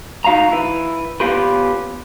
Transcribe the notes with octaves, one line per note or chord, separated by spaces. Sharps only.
D#4 F#4 F5 A5 A#5
E4 B4
B3 C#4 D#4 F4 G4 B4